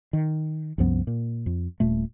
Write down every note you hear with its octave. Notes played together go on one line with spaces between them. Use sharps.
D#3
C2 F#2 F3 B3
A#2
F2
D#1 A#2 A3